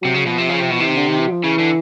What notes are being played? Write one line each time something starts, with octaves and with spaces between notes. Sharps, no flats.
C3 F#3
C#3
B2 F3
C3
C#3
C3
B2 F3
C3 E3
D#3
D3
D#3
E3
F#3
F3
C#3 E3
D3